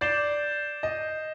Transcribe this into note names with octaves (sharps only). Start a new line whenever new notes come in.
D5 G6 C7 E7 G7
D#5